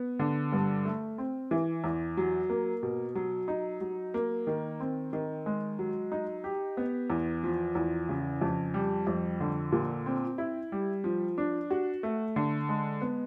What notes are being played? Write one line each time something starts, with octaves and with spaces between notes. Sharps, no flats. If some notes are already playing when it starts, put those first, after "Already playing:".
Already playing: B3
D3
G2
A3
C4
E3
E2
F#3
A#3
B2
F#3
D#4
F#3
A#3
D#3
C4
D#3
G#3
F#3
D#4
G4
B3
E2
F3
E2
C#3
F2
G3
F2
D3
A#2
C4
E4
G3
F3
D4
F#4
A3
D3
G#3
B3